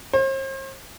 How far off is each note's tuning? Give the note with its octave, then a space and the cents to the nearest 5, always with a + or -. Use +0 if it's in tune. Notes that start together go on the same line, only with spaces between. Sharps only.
C5 +45